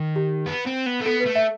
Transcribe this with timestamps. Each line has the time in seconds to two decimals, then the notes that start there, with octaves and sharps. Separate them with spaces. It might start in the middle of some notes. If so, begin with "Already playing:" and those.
Already playing: D#3
0.16 G4
0.46 B3
0.66 C4
0.86 B3
1.00 A3
1.05 B3 A4
1.20 B4
1.26 A3
1.35 E5